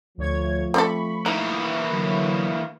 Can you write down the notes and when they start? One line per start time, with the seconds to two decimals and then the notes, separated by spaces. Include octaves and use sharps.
0.18 D2 F3 A3 C#5 G#6
0.74 C4 D4 A4 B5 C#6
1.26 E3 A#3 D#4
1.88 D3 F#3